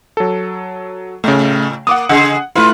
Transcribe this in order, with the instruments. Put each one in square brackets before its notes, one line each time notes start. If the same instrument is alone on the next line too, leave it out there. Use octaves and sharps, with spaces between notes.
[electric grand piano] F#3 A4
[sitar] A2 [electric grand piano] C#3 A3
[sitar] A#3 [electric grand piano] F#5 D6 D#6
[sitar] C#3 G#4 [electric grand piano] F#5
[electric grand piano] A3 E4 [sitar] F4 B4